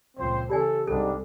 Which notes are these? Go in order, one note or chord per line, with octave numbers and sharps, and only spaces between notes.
C#2 A#2 F3 C4 C5
C#3 E3 G4 A4 D5 G#5
C2 G#2 G3 D4 A4